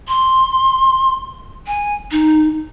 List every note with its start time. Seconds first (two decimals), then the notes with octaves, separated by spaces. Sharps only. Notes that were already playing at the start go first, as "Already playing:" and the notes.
0.08 C6
1.67 G#5
2.11 D#4